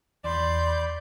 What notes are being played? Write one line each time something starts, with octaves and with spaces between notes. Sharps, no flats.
E2 D5 B5 C6 G6